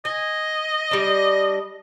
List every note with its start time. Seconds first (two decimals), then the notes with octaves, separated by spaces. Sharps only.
0.05 D#5 G#5
0.91 G3 D4